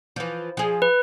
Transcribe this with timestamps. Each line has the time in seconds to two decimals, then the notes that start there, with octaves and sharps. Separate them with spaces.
0.16 E3 F3
0.57 F3 G#4
0.82 B4